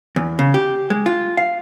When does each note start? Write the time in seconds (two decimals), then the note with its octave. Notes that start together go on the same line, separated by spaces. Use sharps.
0.16 E2
0.39 C#3
0.54 G4
0.90 G#3
1.06 F4
1.37 F5